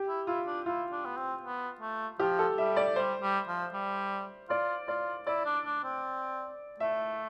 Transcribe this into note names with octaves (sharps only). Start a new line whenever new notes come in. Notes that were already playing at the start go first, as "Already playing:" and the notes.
Already playing: G4
E4
E4 F4
D4
E4 F4
D4
B3
C4
B3
A3
F3 G4
A4
G3 E5
D5
G3 C5
G3
F3
G3
F4 D5
F4 D5
E4 D5
D4
D4
C4
A3 E5